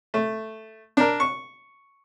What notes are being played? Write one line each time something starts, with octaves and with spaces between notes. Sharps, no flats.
A3
D4 A#4
C#6